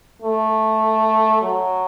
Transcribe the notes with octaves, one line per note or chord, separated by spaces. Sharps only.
A3
F#3